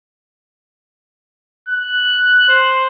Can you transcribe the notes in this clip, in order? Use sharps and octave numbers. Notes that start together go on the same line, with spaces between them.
F#6
C5